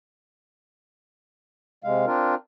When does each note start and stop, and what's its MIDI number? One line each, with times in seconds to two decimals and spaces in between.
1.84 2.06 48
1.84 2.06 56
1.84 2.06 77
2.07 2.35 60
2.07 2.35 62
2.07 2.35 65
2.07 2.35 70